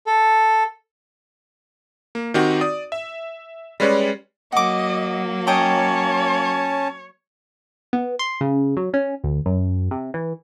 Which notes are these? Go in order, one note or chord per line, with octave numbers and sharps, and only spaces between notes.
A4
A#3
D#3 C4 D#4 F#4 G4
D5 D#6
E5
G3 G#3 C#4 B4 C#5 D5
F#3 A#3 D#5 F#5 D6
C#4 C#5 D#5 G5 A5 A#5
B3
C6
C#3
F#3
C#4
D2
F#2
C3
E3